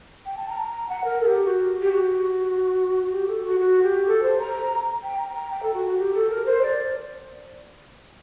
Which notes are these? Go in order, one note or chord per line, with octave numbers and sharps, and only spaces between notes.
G5
A5
A#5
A#5
A#5
F#5
A#4
A4
G4
F#4
G4
F#4
F#4
G4
A4
F#4
F#4
G4
A4
C5
A#5
G5
A#5
A#5
G5
A4
F#4
F#4
G4
A4
A#4
C5
D5